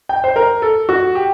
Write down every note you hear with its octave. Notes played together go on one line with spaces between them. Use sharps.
G5
C5
A#4
A4
F#4
G4